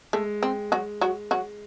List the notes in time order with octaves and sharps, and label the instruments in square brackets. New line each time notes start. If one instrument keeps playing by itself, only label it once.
[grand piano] G#3 [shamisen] A3
[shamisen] C4
F#3 F#4
F#3 F#4
F#3 F#4